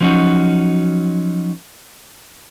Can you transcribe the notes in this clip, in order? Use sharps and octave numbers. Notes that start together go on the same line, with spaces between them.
F3 F#3 C#4 D#4 F#4